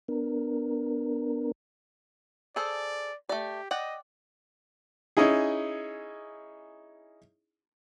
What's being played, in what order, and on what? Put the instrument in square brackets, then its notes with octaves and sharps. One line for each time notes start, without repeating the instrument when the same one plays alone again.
[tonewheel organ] B3 D4 A#4
[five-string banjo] G#4 A4 C5 [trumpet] D5
[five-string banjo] A3 D5 [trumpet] G4
[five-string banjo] D5 F#5 G5 [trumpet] D#5
[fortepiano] C#4 D#4 E4 G#4